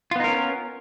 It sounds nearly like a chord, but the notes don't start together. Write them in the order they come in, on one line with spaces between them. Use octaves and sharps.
F4 B3 D#4 A#4 C#4